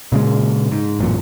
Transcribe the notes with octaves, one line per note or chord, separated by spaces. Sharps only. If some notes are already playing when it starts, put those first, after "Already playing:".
A#2 C#3 G#3
G#2
A1 F#2 A#2